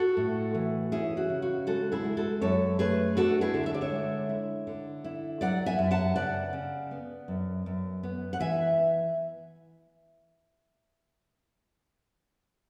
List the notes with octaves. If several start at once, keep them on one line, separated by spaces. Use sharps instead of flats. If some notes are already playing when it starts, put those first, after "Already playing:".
Already playing: F#4 A4
A2
E3
C#4 E4 G#4
F#4
C#3
F#4
G#3 F#4 A4
E4 G#4
G#3
F#4 A4
F#2 A4 C#5
A3 G#4 B4
D4 F#4 A4
E4 G#4
D3
E5
D5
C#5 E5
G#3
E4
D3
E4
F#3 D5 F#5
E5 G#5
F#2
F#5 A5
C#3 D5 F#5
C#3
B3
F#2
F#2
B3
F#5
E3 E5 G#5